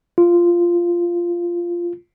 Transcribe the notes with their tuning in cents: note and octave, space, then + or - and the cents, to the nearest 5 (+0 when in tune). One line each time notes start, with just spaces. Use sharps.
F4 -10